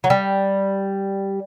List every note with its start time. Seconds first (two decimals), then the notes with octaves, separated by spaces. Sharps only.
0.04 F#3
0.10 G3